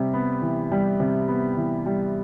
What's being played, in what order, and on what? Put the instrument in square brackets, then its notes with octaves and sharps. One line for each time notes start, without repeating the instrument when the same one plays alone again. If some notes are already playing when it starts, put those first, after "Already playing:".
Already playing: [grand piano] C3 G3
B3
E3
G3
C3
B3
E3
G3